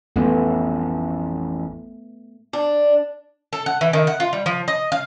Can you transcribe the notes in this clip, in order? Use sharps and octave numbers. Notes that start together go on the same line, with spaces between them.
A1 F2 A3 B3
D4
A4
F#5
E3
D#3
F#5
F4
G3
F3
D#5
F5